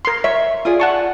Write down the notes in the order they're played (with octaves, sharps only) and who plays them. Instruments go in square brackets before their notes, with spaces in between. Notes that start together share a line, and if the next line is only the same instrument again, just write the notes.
[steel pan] A#4 C6
[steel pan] C#5 [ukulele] E5
[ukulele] F4 G#4 D5
[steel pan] F#5 A5 C#6